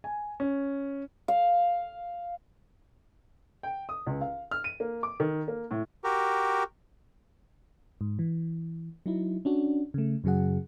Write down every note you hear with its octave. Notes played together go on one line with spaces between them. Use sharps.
G#5
C#4
F5
G5
D#6
C#2
F5
F6
D#7
A#3
D6
D#3
A#3
A2
F#4 G4 A#4
G#2
E3
F#3 D#4 E4
C#4 D4 F#4
C#3 A3
F#2 C#3 F#3 G#4 F#5